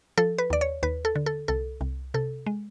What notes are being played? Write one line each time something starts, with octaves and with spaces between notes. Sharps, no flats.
F3 A4
B4
D#2 D5
C#5
D#2 B4
A4
D3
A4
C2 A4
C2
C3 A4
G#3